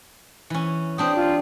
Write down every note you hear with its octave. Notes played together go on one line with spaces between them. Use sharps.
E3 C#4
C4 D4 G4 D#6
F4